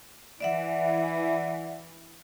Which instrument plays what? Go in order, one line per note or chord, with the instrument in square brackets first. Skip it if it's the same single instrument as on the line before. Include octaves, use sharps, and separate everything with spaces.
[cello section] E3 [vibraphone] D5 E5 F#5